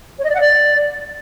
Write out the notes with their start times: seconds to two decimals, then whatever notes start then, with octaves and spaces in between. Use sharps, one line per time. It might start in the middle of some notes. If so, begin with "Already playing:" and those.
0.18 C#5
0.24 D#5
0.29 D5
0.34 F#5
0.40 D5